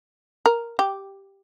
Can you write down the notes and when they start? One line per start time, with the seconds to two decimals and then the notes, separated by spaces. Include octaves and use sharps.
0.46 A#4
0.79 G4